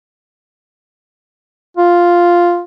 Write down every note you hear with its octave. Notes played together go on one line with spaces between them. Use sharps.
F4